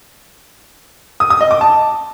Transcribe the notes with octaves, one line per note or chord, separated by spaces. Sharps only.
D#6
D#6
D#5
D6
A5